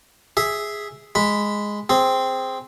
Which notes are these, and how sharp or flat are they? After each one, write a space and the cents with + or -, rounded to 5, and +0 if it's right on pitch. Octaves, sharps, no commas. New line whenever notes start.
G#4 +0 E5 -5
G#3 +0 B5 +0
C4 +0 G#4 +0